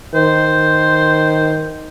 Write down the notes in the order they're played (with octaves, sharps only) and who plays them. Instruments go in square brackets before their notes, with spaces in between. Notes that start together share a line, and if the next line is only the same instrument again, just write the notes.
[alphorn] D#3 [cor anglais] C5